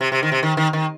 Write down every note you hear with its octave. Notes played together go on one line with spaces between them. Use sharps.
C3
C3
D#3
C3
D#3
D#3
D#3